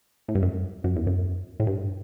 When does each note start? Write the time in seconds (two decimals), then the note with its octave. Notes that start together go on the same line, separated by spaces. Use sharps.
0.28 A2
0.35 G2
0.42 F#2
0.84 F#2
0.96 E2
1.07 F#2
1.60 A2
1.67 G2